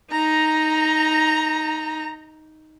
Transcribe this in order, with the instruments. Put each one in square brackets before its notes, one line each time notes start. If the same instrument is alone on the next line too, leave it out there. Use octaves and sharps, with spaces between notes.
[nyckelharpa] D#4 [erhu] A#5